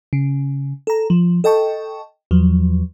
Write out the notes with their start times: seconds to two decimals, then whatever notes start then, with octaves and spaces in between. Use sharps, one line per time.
0.13 C#3
0.87 A4 A#5
1.10 F3
1.44 A4 D#5 G5 A5 C#6
2.31 E2 F3 F#3